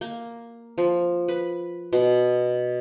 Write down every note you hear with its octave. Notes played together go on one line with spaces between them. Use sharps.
A#3
F3
B4
B2